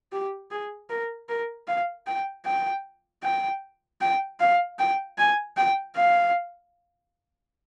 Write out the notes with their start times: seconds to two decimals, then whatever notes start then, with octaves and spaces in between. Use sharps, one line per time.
0.12 G4
0.51 G#4
0.90 A#4
1.29 A#4
1.68 F5
2.07 G5
2.46 G5
3.23 G5
4.01 G5
4.40 F5
4.79 G5
5.18 G#5
5.57 G5
5.96 F5